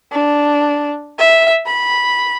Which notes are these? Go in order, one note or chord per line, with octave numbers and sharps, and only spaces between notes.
D4
E5
B5